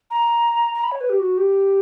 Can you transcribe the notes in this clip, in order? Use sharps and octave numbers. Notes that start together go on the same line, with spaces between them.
A#5
A#5
B5
C#5
B4
G4
F#4
G4